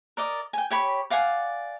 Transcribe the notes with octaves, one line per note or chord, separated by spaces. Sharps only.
A#4 D5 D#5
G5 G#5
G4 C#5 B5
D5 F5 F#5 G#5